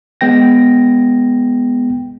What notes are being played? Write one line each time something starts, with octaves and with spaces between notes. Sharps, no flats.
G#3 B3 G5 A#6